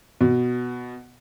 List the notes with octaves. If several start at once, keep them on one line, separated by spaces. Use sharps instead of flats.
B2